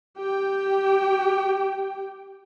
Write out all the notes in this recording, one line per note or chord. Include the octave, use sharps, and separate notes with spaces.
G4 G5